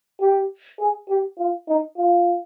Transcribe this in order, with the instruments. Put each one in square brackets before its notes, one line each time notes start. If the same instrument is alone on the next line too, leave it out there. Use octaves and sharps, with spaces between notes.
[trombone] G4
G#4
G4
F4
D#4
F4